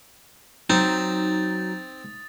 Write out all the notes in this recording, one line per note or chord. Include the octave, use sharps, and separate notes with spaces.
F#3 C4 D#4 D#6 A6